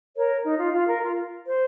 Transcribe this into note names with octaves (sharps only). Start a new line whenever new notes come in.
A#4 C#5
D#4
F4
F4
A#4
F4
C5